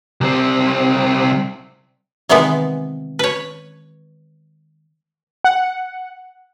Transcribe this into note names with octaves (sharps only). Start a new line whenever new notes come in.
C2 C4
C3 D#3 E3 G#3 B3
B4 C#5
F#5